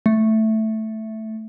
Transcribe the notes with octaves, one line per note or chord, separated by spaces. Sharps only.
A3